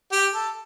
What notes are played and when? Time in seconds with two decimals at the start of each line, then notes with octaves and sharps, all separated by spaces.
0.12 G4
0.33 A4